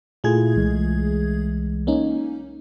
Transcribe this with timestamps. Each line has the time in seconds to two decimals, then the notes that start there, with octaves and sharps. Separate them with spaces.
0.24 A#2 A3 E4 F4 G#4 G#6
0.56 C2 E3 G#3
1.87 A#3 C#4 D#4